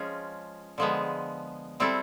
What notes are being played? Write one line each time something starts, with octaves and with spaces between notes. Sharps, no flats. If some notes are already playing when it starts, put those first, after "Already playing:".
Already playing: F3 G#3 C#4 F4
D3 F3 G#3 B3
G3 C4 E4 A4